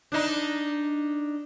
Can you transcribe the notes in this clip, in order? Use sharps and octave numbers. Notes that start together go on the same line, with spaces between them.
D4 D#4